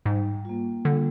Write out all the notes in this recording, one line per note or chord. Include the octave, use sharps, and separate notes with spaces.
G#2 G3
A#3 F4
D3 G3